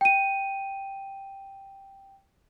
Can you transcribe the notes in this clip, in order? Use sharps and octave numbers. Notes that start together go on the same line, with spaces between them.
G5 D#7